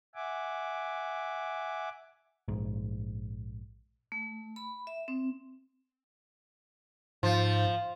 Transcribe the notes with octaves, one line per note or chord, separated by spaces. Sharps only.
E5 F#5 G#5 D6
A#1 G#2
A3
B5
E5
C4
G#2 F3